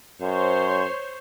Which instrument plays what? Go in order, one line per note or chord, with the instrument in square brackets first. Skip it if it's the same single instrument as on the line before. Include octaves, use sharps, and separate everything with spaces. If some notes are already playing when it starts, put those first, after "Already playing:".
[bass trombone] F#2 [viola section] C5 C#5